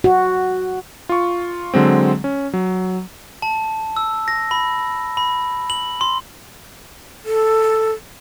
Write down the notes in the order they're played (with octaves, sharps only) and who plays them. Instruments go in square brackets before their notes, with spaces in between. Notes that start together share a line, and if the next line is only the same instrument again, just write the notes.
[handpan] F#4
[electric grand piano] F4 C#6
D3 F#3 G#3 C4
C#4
F#3
[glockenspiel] A5
E6
A#6
B5
B5
F#7
C6
[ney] A4